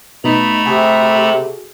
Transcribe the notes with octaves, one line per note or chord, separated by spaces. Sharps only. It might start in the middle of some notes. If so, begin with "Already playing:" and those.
B2 A3 D#4 A#5 B5
C3 F#4 G#4 A4